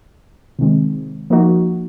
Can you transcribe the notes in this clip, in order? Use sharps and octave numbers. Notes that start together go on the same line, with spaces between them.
C3 D#3 G#3 C4
F3 A#3 D#4 F#4